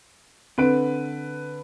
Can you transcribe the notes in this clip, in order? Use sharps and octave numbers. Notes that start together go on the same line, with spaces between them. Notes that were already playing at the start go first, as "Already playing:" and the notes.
D3 C4 B4 D7